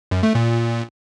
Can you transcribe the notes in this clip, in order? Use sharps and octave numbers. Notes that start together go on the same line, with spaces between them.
F#2
A3
A#2